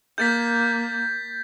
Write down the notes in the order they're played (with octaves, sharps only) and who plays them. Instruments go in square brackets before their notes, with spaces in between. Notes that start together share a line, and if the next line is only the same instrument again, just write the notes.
[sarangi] A#3 [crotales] G6 A6 B6